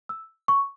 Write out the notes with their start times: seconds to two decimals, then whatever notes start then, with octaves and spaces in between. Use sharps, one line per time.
0.09 E6
0.48 C#6